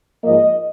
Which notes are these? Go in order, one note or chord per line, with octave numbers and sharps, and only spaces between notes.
G#2 F3 A#3 D#5